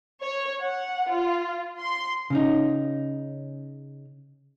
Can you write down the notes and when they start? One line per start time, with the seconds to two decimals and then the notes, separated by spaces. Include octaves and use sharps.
0.23 C#5
0.61 F#5
1.09 F4
1.80 C6
2.30 C#3 C#4 D#4